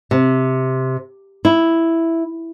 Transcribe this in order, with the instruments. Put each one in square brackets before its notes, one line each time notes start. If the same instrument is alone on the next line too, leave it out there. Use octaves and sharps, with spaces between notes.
[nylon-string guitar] C3
E4